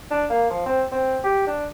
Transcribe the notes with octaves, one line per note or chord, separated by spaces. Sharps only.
D4
A#3
F3
C4
C4
G4
D4